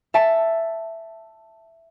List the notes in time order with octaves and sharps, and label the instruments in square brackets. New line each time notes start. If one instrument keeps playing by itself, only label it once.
[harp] E5 A5